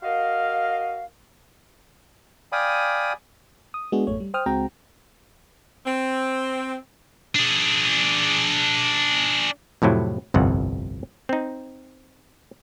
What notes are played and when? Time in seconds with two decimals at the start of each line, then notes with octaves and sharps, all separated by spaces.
0.03 F#4 A#4 D#5 F5
2.52 D5 F5 G5 G#5 B5 D#6
3.74 D#6
3.92 G#3 B3 D4 F#4 G#4
4.07 A1 F#2 A3 C#5
4.20 G3
4.34 C5 G5 D#6 F6
4.46 C#2 G#3 C4 F#4 G5 A#5
5.86 C4
7.35 D4 G#4
9.82 F2 A2 C3 F#3 E4
10.34 G1 C2 F2 F#5
11.29 C4 D#4